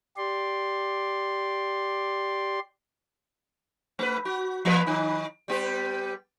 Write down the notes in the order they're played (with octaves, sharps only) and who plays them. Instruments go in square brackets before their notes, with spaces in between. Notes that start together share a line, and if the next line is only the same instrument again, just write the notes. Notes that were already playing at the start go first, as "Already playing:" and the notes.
[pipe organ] G4 D5 C6
[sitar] A3 B4
F#4
E3 A#3 B4
D#3 D#4
G3 B3 G4